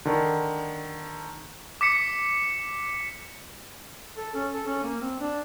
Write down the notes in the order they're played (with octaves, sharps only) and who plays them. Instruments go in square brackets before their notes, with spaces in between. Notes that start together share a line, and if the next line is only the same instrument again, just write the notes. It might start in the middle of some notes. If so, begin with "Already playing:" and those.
[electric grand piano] D3 D#3
[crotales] D6 B6 C#7
[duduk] A4
C#4
A4
C#4
A#3
C4
D4